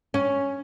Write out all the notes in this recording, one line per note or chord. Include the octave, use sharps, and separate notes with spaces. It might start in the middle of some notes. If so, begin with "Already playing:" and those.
C#4